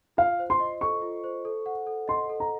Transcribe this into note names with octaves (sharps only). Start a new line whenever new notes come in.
F4 F5
C5
C6
D#5
A4 C#6
F4
C5
A4
F#5
A4
D#5 C6
A4
A#5